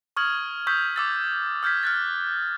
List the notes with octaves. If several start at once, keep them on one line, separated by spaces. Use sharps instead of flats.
C#6 D#6 F6 G#6 F#7
C#6 D#6 E6 G6 G#6 B6
C#6 D6 E6 A6
E6 F6 G6 G#6 B6
F6 F#6 A6